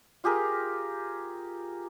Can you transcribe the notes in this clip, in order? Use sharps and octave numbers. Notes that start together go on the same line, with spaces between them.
F4 G4 G#4 A#4